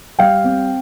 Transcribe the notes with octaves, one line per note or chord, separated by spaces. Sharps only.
G3 F5 G5
C4